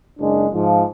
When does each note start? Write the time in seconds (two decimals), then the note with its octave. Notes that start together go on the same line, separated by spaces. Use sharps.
0.18 F#1 G#3 D4
0.52 G#2 F3